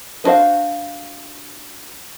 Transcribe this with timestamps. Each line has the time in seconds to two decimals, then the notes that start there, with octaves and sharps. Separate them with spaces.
0.24 B3 D4 F#4 C5 F5